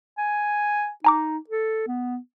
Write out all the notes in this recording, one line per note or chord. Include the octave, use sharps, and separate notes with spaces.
G#5
D#4 G#5 A#5 D6
A4
B3